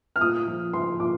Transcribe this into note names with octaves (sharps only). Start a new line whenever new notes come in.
F6
A#2 D#6
F3
F3 C6
A#2 D6